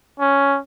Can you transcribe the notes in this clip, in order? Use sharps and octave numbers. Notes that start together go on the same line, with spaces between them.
C#4